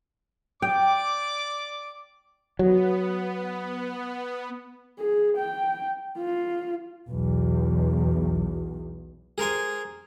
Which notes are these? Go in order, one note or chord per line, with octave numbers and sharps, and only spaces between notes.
D5 G5 D6
F#3 B3
G#4
G5
F4
B1 E2
G#4 A#4 C5 G#5